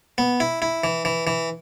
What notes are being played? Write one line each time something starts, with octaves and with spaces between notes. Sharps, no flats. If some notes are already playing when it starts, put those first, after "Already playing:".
B3
E4
E4
E3
E3
E3